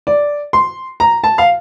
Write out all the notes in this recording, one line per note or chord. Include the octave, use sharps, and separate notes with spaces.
D5
C6
A#5
A5
F5